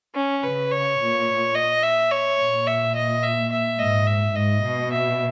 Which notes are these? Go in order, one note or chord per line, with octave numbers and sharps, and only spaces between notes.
C#4
C#3 B4
C#5
A#2
D#5
E5
C#5
A#2
E5
D#5
E5
E5
G#2 D#5
E5
G#2 D#5
B2
E5